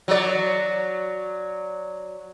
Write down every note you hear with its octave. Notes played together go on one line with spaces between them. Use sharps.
F#3 D5